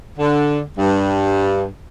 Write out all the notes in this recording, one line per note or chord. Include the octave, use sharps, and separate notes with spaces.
D3
G2